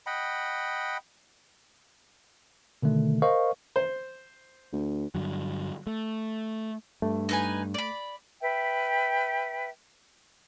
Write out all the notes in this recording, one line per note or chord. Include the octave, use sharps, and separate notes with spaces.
D#5 F#5 G5 B5
B2 D3 D#3 A3
A#4 C5 D#5 F5 C#6
C5
D2
G2 D3 F#3
A3
G2 A3
D#4 B4 G#5
D5 B5
B4 E5 G5